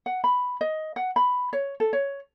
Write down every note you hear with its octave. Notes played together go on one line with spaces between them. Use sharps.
F#5
B5
D#5
F#5
B5
C#5
A4
C#5